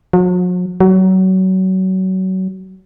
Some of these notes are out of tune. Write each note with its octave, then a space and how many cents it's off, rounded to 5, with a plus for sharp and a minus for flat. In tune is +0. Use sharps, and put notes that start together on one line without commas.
F#3 -45
F#3 +25